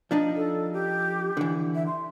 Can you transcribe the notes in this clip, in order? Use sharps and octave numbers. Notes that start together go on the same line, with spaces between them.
F3 D4 D#4
A4
G4
D3 E3
E5
C6